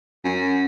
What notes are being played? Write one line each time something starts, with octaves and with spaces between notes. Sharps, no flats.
F#2